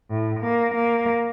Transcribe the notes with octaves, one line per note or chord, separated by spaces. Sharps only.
A2
A#3
A#3